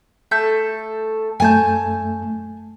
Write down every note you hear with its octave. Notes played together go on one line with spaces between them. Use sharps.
A3 A4 G6
F#2 A3 G#5 A5 G6